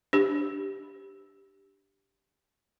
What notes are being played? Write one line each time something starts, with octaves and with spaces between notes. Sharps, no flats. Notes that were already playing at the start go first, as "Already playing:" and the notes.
D4 G4